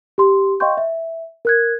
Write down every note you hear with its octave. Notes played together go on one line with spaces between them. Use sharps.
G4 C6
D#5 F5 G5 C6 C#6 G6
E5
A#4 F#6 G#6